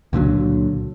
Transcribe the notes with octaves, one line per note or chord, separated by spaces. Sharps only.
C#2 A#2 D3 F#3